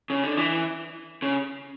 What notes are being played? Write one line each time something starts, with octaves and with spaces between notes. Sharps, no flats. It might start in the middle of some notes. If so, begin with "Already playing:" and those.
C#3
D3
E3
C#3